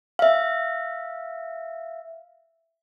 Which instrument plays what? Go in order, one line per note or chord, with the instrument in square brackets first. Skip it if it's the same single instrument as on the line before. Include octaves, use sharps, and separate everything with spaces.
[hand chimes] E5 F5